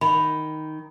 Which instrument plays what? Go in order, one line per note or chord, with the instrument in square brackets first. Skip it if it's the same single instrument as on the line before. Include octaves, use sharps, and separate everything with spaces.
[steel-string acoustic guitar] D#3 [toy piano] B5